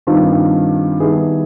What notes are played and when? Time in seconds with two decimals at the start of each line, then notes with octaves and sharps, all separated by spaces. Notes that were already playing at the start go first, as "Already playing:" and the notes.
0.07 G2 D#3 G3 C4 F4
1.00 D#3 G3 B3 E4 G#4